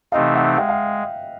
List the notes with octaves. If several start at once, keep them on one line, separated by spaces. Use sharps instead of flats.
C3 E3 A3 C4 D#4 D#5 F5
E5 F#5
G#3 F5 G5
F5 G5